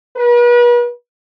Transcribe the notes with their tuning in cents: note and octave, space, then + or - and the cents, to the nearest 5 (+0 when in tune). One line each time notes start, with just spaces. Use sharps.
B4 -40